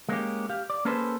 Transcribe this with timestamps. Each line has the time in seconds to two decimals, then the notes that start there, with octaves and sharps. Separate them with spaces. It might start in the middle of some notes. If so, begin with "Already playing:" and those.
0.09 G#3 A#3 C#4 G4
0.49 G4 F5
0.70 D5
0.85 A#3 C#4 G#4 A4 B4 C5